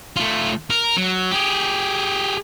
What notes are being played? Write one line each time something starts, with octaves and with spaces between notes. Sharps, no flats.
A3 F4
A#4
F#3
G4 G#4